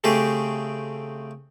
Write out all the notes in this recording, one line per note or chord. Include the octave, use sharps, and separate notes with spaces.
C#3 A3 C4 G4 G#4